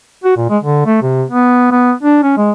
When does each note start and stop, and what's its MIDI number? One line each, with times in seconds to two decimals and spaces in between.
0.24 0.37 66
0.37 0.46 46
0.50 0.58 56
0.63 0.83 50
0.86 0.97 57
1.02 1.23 48
1.28 1.67 59
1.71 1.92 59
2.03 2.18 62
2.23 2.37 61
2.38 2.52 56